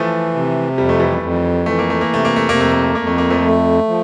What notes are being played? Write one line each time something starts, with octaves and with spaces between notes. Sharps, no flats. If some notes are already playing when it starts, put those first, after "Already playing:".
Already playing: E3 F3 A3
C3
F2 G3
A3
E3 G3
F2
E3 A3
A#3
A3
A#3
C3 A3
A#3
A3
A#3
F2 A3
A#3
A3
F2 A#3
A3
A#3
F3 A3
A3
F3